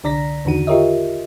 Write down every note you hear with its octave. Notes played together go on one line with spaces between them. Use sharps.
C2 D3 D5 A#5 A#6 B6
E2 D3 D#3 F#4 D#7
F4 G4 A#4 C#5 D#5 E5